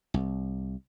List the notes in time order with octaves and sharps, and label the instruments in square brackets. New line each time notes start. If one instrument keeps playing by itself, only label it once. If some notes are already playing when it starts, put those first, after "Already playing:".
[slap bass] C2